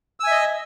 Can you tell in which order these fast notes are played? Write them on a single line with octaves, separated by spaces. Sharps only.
E6 G#5 E5 D#5